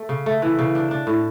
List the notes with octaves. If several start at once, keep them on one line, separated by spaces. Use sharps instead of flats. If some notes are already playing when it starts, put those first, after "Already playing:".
Already playing: A3
C#3
A3
E3
C#3
D4
D4
A2